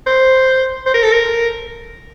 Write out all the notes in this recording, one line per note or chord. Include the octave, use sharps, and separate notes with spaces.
C5
C5
A#4
A4
A#4